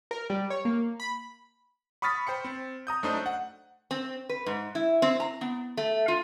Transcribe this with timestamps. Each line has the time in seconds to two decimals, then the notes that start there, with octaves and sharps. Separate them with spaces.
0.11 A#4
0.30 G3
0.50 C#5
0.65 A#3
1.00 B5
2.02 B5 C#6 D#6 F6 A6 B6
2.27 C5 G5 B5 C#7
2.45 C4
2.87 A#5 D#6 G6
3.03 F#2 A3 D4 D#4 C5 D#6
3.26 F#5
3.91 C4
4.29 B4
4.46 G#2
4.75 E4
5.02 C4
5.20 A#5
5.41 B3
5.77 A3
6.08 F4